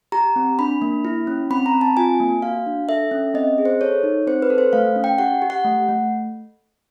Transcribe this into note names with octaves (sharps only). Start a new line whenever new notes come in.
G4 A#5
C4
D4 B5
A#3
E4
C#4
C4 B5
A#5
C4
A5
F4 G#5
A#3
F#4 F5
D4
A4 E5
C#4
C4 D#5
G#4
C5
A4 C#5
D#4
C4 C5
B4
A4
C5
A3 F5
C#4
G5
G4 F#5
G4
F#5
A3
A3